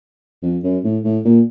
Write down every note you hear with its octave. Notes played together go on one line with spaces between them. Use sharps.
F2
F#2
A2
A2
A#2